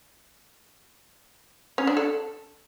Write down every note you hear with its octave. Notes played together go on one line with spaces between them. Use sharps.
C#4
D4
A4